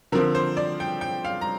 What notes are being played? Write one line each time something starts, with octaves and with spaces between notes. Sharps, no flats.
D3 F3 C4 A#4
C5
D5
G5
G5
F5
A#5